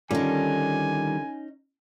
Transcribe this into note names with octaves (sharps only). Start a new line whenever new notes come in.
D3 D#3 G3 C#4 D#4 F4 A4 G#5